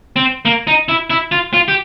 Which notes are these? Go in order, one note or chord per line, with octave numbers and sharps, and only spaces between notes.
C4
A#3
D#4
E4
E4
F4
F4
G4